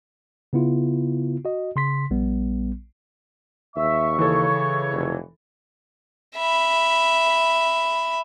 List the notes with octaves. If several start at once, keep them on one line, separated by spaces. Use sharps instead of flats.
C#3 B3 E4 F4
F#4 D#5
C#3 C6 B6
A#1 G3 B3
D#2 E5 C#6
C#3 E3 A4 C#5
F1
E5 B5